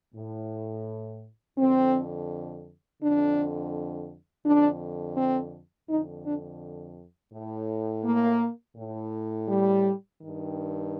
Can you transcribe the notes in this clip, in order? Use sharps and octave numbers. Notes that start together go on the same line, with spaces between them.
A2
F2 D3 C4
F2 D3 D4
F2 D3 D4
C4
F2 D3 D#4
D4
A2
A#3
A2
G3
G2 D#3